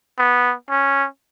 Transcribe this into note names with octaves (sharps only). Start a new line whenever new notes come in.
B3
C#4